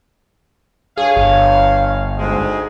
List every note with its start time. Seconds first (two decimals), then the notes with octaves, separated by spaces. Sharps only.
0.97 G2 G#4 C#5 F5
1.17 G1
2.18 D2 G#2 G#3